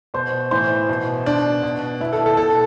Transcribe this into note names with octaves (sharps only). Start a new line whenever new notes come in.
B2 C5
A2 E3 C5
B2
B2 D4
B2
B2 E4
A4
A4
B2 A4